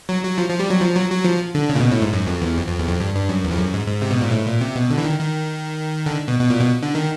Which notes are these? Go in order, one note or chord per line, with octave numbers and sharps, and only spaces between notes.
F#3
F#3
F3
F3
G3
F#3
F3
F#3
F#3
F3
D3
C#3
A#2
B2
A2
G#2
F#2
F2
E2
F2
F2
E2
F2
G2
G2
F#2
E2
F2
F#2
G#2
G#2
C3
B2
A#2
A2
A#2
C3
B2
D3
E3
D#3
D#3
D3
B2
B2
A#2
B2
D3
D#3